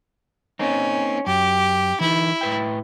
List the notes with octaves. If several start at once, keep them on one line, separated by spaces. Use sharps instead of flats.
A#3 C4 C#4 D#4
F#2 G4
E3 D#4 E4
A2 B4 G5